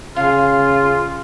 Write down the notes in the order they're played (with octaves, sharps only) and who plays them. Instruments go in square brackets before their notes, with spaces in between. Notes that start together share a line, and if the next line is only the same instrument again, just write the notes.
[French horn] C#3 [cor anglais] F4 [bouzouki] G#4 F5